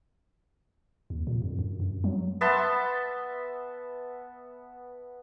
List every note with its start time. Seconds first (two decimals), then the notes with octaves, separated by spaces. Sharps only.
1.10 D#2
1.27 A#2
1.42 F2
1.59 F#2
1.80 F#2
2.04 F#3
2.41 B3 E5 A5 C6